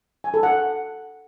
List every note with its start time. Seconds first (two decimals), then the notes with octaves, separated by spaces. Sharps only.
0.24 G#5
0.34 A4
0.43 F#5